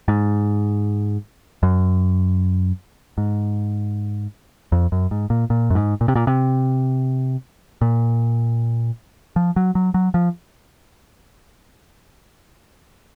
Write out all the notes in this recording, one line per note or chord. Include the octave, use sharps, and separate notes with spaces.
G#2
F#2
G#2
F2
F#2
G#2
A#2
A#2
F#2
G#2
A#2
C3
A#2
C3
A#2
F3
F#3
F#3
F#3
F3